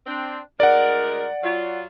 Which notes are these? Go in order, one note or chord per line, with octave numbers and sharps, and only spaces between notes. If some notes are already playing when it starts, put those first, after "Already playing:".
C4 D4
D2 G#3 A#4 D5 F#5
F#3 F4